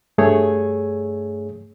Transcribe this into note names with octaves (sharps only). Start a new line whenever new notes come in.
G2 A3 G#4 C#5